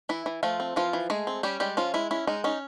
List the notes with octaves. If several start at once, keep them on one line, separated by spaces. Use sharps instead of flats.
E3 E4
E3
F3 A3 F4
C4
E3 F3 F4
E3
G#3 A3 G#4
C4
G3 C#4 G4
G3 G#3 G4
F3 C#4 F4
G#3 E4
C#4 E4
G#3 D#4
C#4 D#4